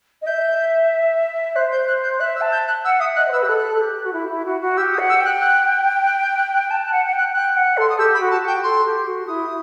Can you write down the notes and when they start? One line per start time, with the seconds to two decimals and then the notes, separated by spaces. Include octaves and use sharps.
0.22 D#5
0.26 E5 G6
1.55 C5 F#6
1.72 G6
1.87 F#6
2.03 G6
2.20 E5 F#6
2.36 E6
2.41 A5
2.52 G6
2.67 F#6
2.85 F#5 E6
3.00 E5 D#6
3.16 D#5 F#6
3.28 C5
3.32 B4 E6
3.42 G4 E6
3.48 A4 F#6
3.75 A4
3.81 G4
4.05 F#4
4.13 E4
4.29 E4
4.45 F#4
4.61 F#4
4.77 G4 E6
4.93 D#6
4.98 F#5
5.09 E6
5.20 G5 F#6
5.41 F#6
6.06 F#6
6.22 G6
6.38 F#6
6.54 F#6
6.70 A5 G6
6.86 F#6
6.91 F#5
7.05 F#5
7.13 G5
7.18 F#6
7.34 G5 F#6
7.56 F#5
7.77 A4 C6
7.89 D#6
7.98 G4 E6
8.14 B5
8.20 F#4
8.31 A5
8.42 F#4
8.47 G5
8.63 A4 C6
8.84 G4
9.06 F#4
9.27 E4 D#6